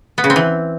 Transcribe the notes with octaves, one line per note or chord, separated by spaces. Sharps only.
B3
C#3
C4
E3